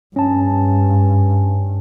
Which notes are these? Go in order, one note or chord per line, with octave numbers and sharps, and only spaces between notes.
G2 C#4 A5